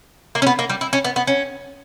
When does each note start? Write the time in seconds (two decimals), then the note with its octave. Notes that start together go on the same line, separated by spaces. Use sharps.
0.35 A#3
0.42 C#4
0.47 B3
0.59 A#3
0.70 G3
0.81 E4
0.93 C#4
1.04 B3
1.16 B3
1.27 C#4